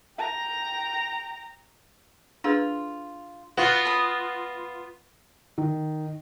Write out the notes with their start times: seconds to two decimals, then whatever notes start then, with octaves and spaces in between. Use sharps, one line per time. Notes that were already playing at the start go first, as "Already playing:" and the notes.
0.17 G5 A#5
2.44 D4 F4 G#4 B4
3.58 B3 F4 F#4
3.85 B5 D#6
5.58 D#3